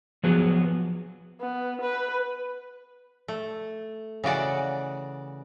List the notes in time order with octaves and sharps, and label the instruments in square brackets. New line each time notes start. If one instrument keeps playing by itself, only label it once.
[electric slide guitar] F3 F#3 B3 G#4
[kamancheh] B3
B4
[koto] A3
C#3 E3 F#4 D5 F#5